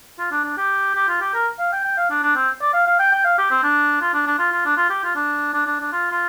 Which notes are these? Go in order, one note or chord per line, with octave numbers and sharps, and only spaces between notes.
F4
D4
D4
G4
G4
F4
G4
A#4
F5
G5
G5
F5
D4
D4
C4
D5
F5
F5
G5
G5
F5
G4
C4
D4
F4
D4
D4
F4
F4
D4
F4
G4
F4
D4
D4
D4
D4
F4
F4